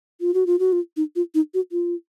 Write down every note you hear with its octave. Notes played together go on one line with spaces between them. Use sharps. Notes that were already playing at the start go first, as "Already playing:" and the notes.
F4
F#4
F4
F#4
F4
D#4
F4
D#4
F#4
F4